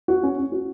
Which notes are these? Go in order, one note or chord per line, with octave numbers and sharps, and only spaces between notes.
F#4
C#4
C#4
F#4